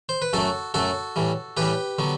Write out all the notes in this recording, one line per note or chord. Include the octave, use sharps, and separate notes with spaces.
C5
B4
F#2 F#3 A3 F#4 A4
F#2 F#3 A3 F#4 A4
A2 E3 G3
A2 E3 G3 G4 B4
D3 F#3 B3